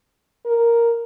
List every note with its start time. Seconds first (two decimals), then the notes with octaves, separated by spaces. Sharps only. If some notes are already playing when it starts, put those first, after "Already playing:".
0.45 A#4